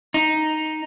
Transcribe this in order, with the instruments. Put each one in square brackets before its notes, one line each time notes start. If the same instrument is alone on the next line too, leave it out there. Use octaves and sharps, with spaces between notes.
[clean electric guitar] D#4